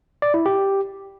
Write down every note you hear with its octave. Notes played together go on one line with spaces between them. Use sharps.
D5
E4
G4